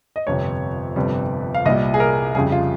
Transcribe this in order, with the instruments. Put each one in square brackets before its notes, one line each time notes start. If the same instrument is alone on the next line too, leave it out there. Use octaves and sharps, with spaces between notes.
[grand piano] D#5
G1 F2 C3 C#5
G1 F2 C3 G3
F5
C2 A#2 G3 D#5
G#4
A#4
F2 C#3 G3 G#4
F4